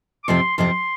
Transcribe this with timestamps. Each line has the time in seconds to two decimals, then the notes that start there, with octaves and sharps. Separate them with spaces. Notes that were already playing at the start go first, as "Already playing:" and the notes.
0.24 D6
0.28 F2 C3 F3 C4 C6
0.58 F2 C3 F3 C4 C6